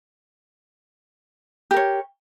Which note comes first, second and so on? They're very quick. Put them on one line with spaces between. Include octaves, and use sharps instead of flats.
G4 A#4 C#5